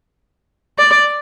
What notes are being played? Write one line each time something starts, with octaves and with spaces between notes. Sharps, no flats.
D5